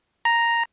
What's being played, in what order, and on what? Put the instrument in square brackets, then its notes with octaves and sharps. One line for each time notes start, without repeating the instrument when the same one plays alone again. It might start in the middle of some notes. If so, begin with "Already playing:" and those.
[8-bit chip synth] A#5